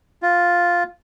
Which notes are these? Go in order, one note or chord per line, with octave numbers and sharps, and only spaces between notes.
F4